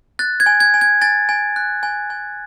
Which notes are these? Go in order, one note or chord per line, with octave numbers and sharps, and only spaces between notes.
F#6 A6
G#6
G#5
G#6
G#5
G#6
G#5 A6
G#5
F#6
G#5
G#5